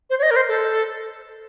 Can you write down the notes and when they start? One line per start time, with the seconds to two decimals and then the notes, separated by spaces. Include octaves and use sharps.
0.10 C5
0.19 C#5
0.23 D#5
0.31 A#4
0.36 C5
0.49 A4